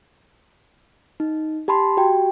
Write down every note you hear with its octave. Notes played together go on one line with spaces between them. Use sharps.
D#4
G4 A5 B5 C6
F#4 G4 G5